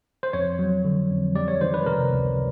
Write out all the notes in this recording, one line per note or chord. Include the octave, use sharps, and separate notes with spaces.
C5
F2 C#5
F#3
D3
F2
G3 D5
C#5
D#3 C5
B4
C3 A#4
C#2